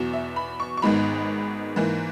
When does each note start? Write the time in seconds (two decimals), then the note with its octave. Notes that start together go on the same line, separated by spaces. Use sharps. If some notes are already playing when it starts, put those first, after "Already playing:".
Already playing: E2 B2 F#3 B3
0.13 E5
0.36 B5
0.60 C#6
0.77 C#6
0.82 G#1 G#2 D#3 G#3 B3 B5
1.76 G#2 E3 A#3